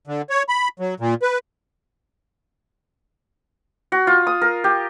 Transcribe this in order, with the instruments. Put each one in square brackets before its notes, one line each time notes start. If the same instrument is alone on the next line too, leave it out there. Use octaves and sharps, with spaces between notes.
[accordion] D3
C#5
B5
F#3
A#2
B4
[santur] F#4
F4
D#6
A#4
G4